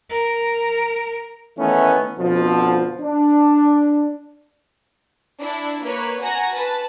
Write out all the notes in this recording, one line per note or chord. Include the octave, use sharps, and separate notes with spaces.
A#4
D#3 E3 A3 B3 C#4
F2 B2 D3 F3
D4
D4 E4
A#3 B4 C#5
F#4 G#5 A#5 A#6
B4 A5